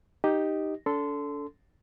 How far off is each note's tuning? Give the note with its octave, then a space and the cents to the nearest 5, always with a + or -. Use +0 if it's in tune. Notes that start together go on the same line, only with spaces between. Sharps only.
D#4 +0 G4 +0 D#5 +0
D4 -40 A4 +0 C6 -20